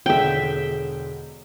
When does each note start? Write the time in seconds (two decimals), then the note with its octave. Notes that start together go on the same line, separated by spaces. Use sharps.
0.06 E1 D3 G#3 E5 G5